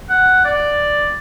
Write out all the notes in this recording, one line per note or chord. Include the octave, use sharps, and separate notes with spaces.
F#5
D5